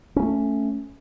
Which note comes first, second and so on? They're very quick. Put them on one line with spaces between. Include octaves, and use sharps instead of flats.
C#4 A#3 A3